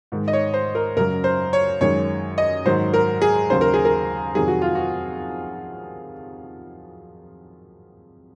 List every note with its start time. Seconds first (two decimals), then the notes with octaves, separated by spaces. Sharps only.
0.12 G#2 D#3 G#3
0.28 D#5
0.33 C#5
0.54 C5
0.75 A#4
0.97 F#2 C#3 F#3 A#4
1.24 C5
1.53 C#5
1.81 F#2 D#3 G#3 C#5
2.38 D#5
2.65 G#2 D#3 F#3 C5
2.94 A#4
3.22 G#4
3.50 D#2 C#3 F#3 C5
3.61 A#4
3.74 G#4
3.85 A#4
4.35 F2 C3 D#3 F#3 G#4
4.48 F#4
4.62 F4
4.75 F#4